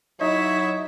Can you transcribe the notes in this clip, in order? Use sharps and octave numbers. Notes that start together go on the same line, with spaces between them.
F#3 D#4 E4 C#5 E5